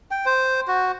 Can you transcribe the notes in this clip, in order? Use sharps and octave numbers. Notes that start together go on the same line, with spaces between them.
G5
C5
F#4